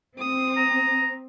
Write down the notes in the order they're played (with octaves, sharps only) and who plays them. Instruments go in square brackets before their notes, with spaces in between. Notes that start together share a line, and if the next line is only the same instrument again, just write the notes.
[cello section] C4 [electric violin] D#6
[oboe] A#5